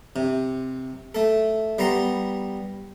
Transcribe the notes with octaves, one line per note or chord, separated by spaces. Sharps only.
C3
A3 A4
G3 B3 A#5 C6